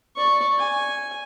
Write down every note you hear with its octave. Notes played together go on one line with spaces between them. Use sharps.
D5 C#6
G#5